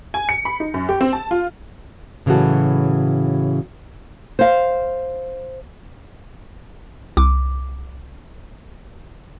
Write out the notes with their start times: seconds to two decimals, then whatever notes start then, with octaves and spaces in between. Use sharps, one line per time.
0.14 G#5
0.29 C#7
0.45 B5
0.60 D#4
0.74 F#2
0.89 G4
1.01 C4
1.13 A5
1.31 F4
2.26 A2 C#3 E3 F#3 F#4 A4
4.39 C5 F5
7.17 C2 D6